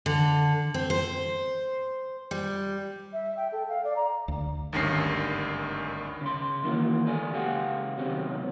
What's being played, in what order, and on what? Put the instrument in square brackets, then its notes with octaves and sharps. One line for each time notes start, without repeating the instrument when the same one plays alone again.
[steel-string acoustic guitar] D3
C4
C5
G3
[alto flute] E5
G5
A4
F5
D5
A#5
[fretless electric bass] D2
[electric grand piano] G#1 D2 G2 D#3 C#4 C7
[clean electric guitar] C#3 C6
D#3 E3 A#3 F#4
A3 A4 D5 G#5
C#3 G4 F5 F#5
C3 D#3 F#3 B3 C4